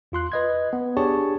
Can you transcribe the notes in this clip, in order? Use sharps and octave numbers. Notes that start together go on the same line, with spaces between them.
E2 F4 C6 F#6
B4 D#5 G#6
B3
D4 G4 G#4 C#5 A5 C#6